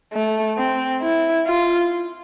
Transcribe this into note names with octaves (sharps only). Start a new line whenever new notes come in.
A3
C4
E4
F4